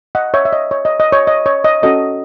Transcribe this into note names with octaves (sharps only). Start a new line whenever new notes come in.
D#5 F#5
C#5 E5
E5
D#5
C#5
D#5
D#5
C#5
D#5
C#5
D#5
C#4 F#4 A4 C#5 D#5